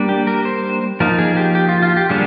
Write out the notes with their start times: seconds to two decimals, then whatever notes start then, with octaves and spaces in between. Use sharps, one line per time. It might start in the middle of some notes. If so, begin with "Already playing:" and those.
Already playing: G3 A#3 D4
0.09 G4
0.27 A#4
0.45 C5
1.00 F3 A#3 D#4 A#4
1.19 G#4
1.37 G4
1.55 G4
1.69 F4
1.82 F4
1.97 G4
2.10 D3 G3 A#3 D4 G#4